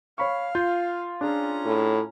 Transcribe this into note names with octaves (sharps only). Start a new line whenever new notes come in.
C#5 F5 B5 C#6
F4 G6
C#4 D4 G#4 A#5
A2